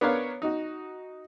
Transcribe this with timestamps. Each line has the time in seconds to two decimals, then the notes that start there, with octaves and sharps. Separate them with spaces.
0.01 B3 D4 A#4 C#5 F5
0.42 D#4 F#4